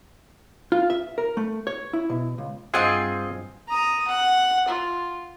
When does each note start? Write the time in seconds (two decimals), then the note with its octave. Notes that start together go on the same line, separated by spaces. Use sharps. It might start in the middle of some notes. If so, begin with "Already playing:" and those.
0.72 F4
0.90 E5
1.18 A#4
1.37 A3
1.67 C#5
1.93 E4
2.10 B2
2.38 C#2
2.74 G2 C4 F4 G#4 D#5 F#5 G#5
3.68 A#5 D#6
4.07 F#5
4.68 F4